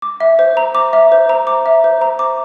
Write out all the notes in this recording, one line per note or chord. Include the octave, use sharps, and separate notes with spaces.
D6
E5
C5
A#5
D6
E5
C5
A#5
D6
E5
C5
A#5
D6